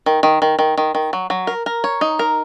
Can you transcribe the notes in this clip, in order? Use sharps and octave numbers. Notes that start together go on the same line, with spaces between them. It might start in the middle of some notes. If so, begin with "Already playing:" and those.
D#3
D#3
D#3
D#3
D#3
D#3
F#3
F#3
A#4
A#4
C#5
D#4
A#4